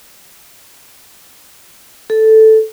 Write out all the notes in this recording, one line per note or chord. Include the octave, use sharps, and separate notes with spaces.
A4